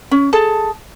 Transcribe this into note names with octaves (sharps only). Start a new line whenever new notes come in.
C#4
G#4 A4 A5